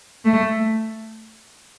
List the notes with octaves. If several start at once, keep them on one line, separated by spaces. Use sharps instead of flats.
A3